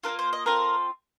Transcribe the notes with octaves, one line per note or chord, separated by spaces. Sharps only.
A#3 D4 F4 A#4
C5
D#5
C4 F4 A4 A#4